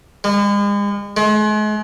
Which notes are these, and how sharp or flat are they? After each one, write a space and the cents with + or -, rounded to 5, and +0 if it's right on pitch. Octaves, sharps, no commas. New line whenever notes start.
G#3 -40
G#3 +40